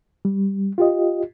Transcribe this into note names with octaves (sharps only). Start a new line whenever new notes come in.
G3
F4 G4 D#5